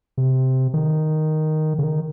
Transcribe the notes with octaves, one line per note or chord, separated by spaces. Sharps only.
C3
D#3
C#3
D#3